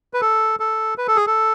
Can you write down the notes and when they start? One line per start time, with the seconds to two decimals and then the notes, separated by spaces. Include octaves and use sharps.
0.14 B4
0.21 A4
0.60 A4
0.98 B4
1.08 A4
1.16 G#4
1.27 A4